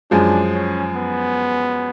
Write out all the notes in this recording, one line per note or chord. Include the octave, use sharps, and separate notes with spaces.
F#2 F3 G#3 D4
C#4
B3